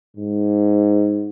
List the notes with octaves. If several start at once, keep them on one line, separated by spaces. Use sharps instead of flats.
G#2